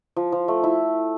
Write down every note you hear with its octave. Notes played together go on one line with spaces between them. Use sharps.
F3
F3
A3
E4